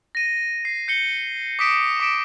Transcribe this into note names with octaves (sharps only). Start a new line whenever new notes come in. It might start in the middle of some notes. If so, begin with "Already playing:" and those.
A#6 D#7
C7
G6 C#7 G7
D6 D#6 B6 D7 E7
D6 B6 D7 E7